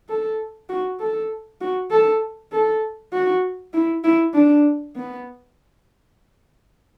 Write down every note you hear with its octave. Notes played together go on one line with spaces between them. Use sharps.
A4
F#4
A4
F#4
A4
A4
F#4
E4
E4
D4
B3